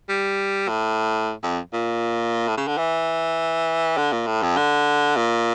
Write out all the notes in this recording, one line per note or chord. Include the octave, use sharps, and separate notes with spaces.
G3
A2
F2
A#2
A2
C#3
D3
E3
D3
A#2
A2
F2
D3
A#2